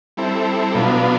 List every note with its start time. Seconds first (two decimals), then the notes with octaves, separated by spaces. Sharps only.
0.17 G3 C4 E4 A4
0.74 B2 F#3 B3 D4 F4